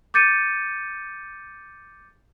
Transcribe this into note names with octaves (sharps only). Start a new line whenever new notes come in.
D6 G6 A6 C#7 D#7